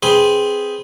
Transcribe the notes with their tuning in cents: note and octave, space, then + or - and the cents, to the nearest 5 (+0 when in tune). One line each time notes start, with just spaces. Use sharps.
C4 +0 G#4 +0 B4 +0